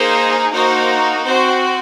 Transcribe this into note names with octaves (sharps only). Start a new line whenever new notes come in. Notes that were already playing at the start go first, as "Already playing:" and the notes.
Already playing: A#3 D#4 G#4 C5
A#3 D#4 F#4 C5
C4 F#4 C5